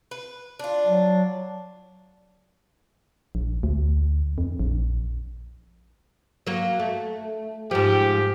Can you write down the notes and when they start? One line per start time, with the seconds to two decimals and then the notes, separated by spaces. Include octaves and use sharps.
0.11 B4
0.59 D4 F4
0.87 F#3
3.35 A#1
3.63 D2
4.38 F2
4.59 A#1
6.47 F#3 A#3
6.80 A3
7.71 G#2 F3 G4